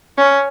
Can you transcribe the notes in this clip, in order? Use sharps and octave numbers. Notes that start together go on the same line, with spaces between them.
C#4